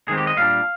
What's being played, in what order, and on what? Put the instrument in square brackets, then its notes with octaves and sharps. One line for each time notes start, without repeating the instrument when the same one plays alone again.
[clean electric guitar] D#3 G#3 C4 G#4
G4
D#5
A#2 G3 D4 F5